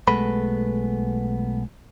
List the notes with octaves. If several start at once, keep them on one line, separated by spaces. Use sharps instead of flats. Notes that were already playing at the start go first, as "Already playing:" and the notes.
B1 G#3 A3 B3 B4 B5